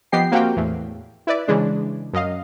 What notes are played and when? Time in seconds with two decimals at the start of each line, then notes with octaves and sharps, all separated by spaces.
0.12 F3 B3 G4 D#5 G5 C7
0.32 A#3 C4 F#4 G4 F5 G5
0.56 E2 A2
1.27 E4 B4 D5
1.47 C#3 E3 G#3 D4
2.13 F#2 D#5 F5